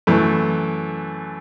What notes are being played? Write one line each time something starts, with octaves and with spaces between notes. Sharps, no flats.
F#2 E3 A3